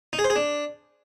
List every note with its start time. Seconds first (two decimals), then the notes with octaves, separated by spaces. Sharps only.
0.13 D#4
0.19 G#4
0.24 C5
0.30 G#4
0.36 D4